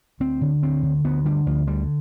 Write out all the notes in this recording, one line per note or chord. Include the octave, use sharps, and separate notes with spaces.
D2 C4
D3
D2 C4
D3
D2 B3
D3 G3
D2 F3
D3 G3